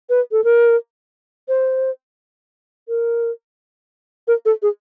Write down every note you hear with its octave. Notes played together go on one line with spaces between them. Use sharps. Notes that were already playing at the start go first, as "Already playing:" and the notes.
B4
A4
A#4
C5
A#4
A#4
A4
G#4